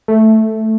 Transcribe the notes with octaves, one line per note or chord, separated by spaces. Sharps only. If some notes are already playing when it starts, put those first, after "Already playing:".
A3